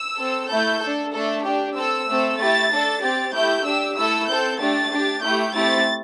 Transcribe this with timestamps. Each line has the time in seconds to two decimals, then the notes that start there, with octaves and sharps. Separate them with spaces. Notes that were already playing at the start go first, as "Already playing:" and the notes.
Already playing: E6
0.17 C4 A4
0.49 A3 E4 A4 G6
0.80 A4
0.85 D4
1.13 A3 D4 A4
1.44 D4 G4
1.75 C4 A4 E6
2.07 A3 C4 A4
2.39 A3 E4 G4 A6
2.70 D4 A4
3.02 C4 G4 A6
3.33 A3 E4 G4 G6
3.65 D4 G4 E6
3.96 A3 E4 A4 E6
4.28 C4 A4 G6
4.60 A3 D4 G4 A6
4.92 D4 G4
5.22 A3 E4 G4 G6
5.54 A3 C4 E4 G4 A6